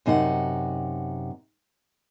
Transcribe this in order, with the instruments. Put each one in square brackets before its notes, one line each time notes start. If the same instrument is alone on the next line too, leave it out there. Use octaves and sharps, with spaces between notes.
[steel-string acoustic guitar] F#2 C3 D#4 G#4 F#5